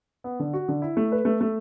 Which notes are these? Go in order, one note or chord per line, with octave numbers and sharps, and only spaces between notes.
B3
D3
F#4
D3
E4
A3
B4
A3
A3